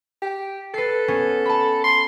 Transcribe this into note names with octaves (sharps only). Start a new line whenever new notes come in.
G4
A4 B4 C7
B3 C#4
A5 B5
C6